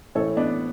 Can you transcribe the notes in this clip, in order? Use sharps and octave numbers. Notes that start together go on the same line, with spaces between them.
A2 E3 A4 C#5
B3 D4